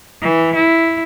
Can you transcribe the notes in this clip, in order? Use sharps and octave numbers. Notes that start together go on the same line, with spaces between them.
E3
E4